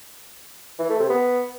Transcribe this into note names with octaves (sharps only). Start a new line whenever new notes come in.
E3
A3
C3
B3